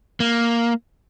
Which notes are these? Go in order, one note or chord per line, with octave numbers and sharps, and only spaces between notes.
A#3